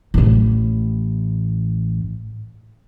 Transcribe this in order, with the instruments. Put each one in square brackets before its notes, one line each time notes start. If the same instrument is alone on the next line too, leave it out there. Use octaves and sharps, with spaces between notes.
[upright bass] A1 A2